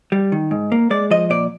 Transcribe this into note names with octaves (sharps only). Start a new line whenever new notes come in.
G3
D#3
G#2
A#3
G#3 D5
F3 D#5
A#2 D5